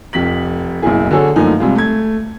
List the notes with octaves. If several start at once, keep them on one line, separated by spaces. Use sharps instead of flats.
F1 F2 B6 F#7
F#1 B1 E4 G#4
D3 F#4 G#4 A4 C#5
F#2 D3 F3 A3 A#3 D#4
C3 G3 G#3 F4
A3 G#6